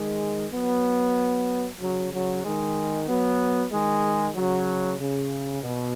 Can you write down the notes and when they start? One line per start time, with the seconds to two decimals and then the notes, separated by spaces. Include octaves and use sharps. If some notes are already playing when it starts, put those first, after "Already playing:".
Already playing: D#3 G#3
0.52 F#3 B3
1.80 C#3 F#3
2.12 C#3 F#3
2.44 D#3 G#3
3.08 F#3 B3
3.72 D#3 G#3
4.35 C#3 F#3
5.00 C#3
5.63 B2